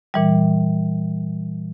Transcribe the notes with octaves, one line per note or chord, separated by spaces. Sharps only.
A#2 E3 G3